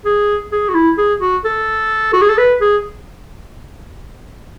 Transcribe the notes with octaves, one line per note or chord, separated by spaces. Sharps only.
G#4
G#4
F#4
E4
G#4
F#4
A4
F#4
G#4
A4
B4
G#4